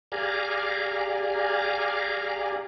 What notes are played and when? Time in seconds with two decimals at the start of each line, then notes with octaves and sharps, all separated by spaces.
0.12 G4 G#4 D5 F5 G#5 A#5